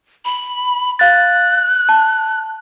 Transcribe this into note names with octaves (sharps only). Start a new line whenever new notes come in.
B5
F5 F#6 A6
A5